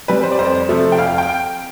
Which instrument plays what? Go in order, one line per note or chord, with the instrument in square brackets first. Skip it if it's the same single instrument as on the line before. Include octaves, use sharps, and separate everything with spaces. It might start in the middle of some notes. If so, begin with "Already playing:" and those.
[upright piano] G3 C4 B4
C5
D5
F2 C5
C3 F3 A3
G5
F2 F5
G5